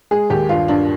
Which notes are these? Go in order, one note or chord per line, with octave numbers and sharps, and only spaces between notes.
G#3 G#4
D#2 G4
G2 F4
G2 D4